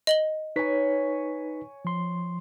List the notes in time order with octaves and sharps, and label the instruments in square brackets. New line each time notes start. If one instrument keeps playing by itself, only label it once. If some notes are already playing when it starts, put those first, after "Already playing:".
[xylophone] D#5 F#7 G7
[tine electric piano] D#4 B4 B6 [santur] C#5 G#5
[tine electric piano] F3 C6